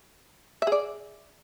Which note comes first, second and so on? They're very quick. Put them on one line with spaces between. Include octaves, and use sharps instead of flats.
E5 G#4 D5